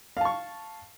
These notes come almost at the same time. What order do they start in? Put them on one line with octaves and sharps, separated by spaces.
F5 A5 C#6